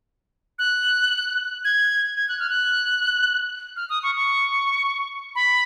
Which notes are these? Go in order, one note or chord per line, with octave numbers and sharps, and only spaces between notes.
F#6
G#6
G#6
F#6
F6
F#6
F6
D#6
C#6
C#6
B5